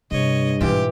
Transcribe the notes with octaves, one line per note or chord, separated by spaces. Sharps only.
G2 C3 C#5 D#5
G#2 B2 E3 F4 G4